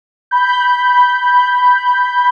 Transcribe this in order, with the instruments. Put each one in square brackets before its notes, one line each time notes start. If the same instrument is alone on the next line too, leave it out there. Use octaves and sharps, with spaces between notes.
[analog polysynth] B5 G6